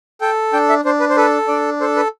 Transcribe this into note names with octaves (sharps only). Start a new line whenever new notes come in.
A4 G5
D4 G5
E5
D4 C5
B4
C5
A4 B4
D4 D5
A4 C5
B4